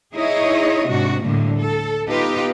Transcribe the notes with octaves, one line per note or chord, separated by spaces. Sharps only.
D#4 E4 G#4 C#5 D#5
G#2 C3 D4 F#4
D2 A2 D3 G3 A#3
A4
B3 D#4 F4 G4 B4